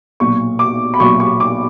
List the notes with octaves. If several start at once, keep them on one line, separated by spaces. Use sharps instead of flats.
B1 A#2 F#3 C#6
D6
B5
B1 A#2 F#3 C#6
C#6
D6